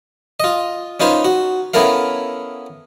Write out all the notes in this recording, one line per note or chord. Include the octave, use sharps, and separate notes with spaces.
F4 D#5
C#4 D#4 F4 B4 C5
F#4
B3 C#4 E4 A4 A#4 F5